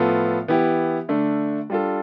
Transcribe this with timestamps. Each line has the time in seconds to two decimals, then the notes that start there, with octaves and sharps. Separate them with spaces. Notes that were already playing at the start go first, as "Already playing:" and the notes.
Already playing: A2 F3 B3 F4 A4
0.48 E3 B3 E4 G4
1.09 D3 A3 D4
1.70 G3 D4 F4 A4